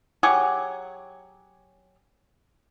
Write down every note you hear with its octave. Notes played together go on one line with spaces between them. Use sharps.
F#3 G4 G#4 F#5